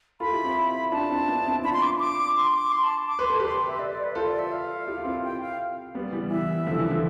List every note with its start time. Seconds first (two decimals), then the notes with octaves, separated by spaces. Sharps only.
0.20 F4 A4 B5
0.32 E4 G4
0.44 C4 E4
0.92 D4 F4 A5
1.10 C4 E4
1.28 B3 D4
1.46 C4 E4
1.64 D4 F4 B5
1.73 C6
1.82 D6
2.00 D6
2.36 C6
2.53 D6
2.72 C6
2.83 A5
3.08 D6
3.19 B4 C6
3.29 A4
3.40 G4 B4 C6
3.68 E5
3.79 D5
3.91 D5
4.04 B4
4.15 F4 A4 C5
4.27 D5
4.39 E5
4.52 F5
4.87 E4 G4
4.98 F4
5.05 C4 E4
5.24 G5
5.42 F5
5.95 G3 B3
6.13 E3 G3
6.30 E3 E5
6.67 D3 F3
6.79 E3
6.91 D3 F3